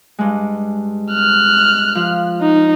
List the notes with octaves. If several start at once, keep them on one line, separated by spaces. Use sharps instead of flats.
G2 G#3
F6 F#6
F3
D#4